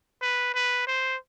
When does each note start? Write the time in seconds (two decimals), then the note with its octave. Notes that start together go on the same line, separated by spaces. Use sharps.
0.22 B4
0.54 B4
0.87 C5